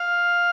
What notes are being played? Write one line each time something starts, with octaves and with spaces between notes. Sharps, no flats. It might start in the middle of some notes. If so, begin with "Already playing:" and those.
Already playing: F5